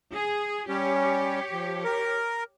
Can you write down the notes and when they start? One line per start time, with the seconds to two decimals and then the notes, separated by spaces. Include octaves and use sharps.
0.14 G#4
0.68 G3 C#4 G4 C#5
1.52 F3
1.84 A#4